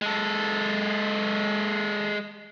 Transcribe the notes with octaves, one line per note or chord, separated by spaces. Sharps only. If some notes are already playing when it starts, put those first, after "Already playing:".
G#3 A4